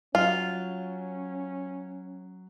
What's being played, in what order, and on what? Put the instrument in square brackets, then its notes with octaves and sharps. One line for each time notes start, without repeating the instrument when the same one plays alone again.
[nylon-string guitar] F#3 [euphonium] C#4 [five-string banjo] F4